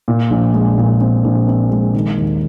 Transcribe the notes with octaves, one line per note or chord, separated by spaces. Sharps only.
A#2
A#1
G#3
A#2
C4
A#1
C4
G#3
D#3
D#2